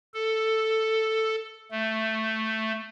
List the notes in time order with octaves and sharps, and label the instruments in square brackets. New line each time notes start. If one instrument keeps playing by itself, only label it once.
[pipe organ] A4
A3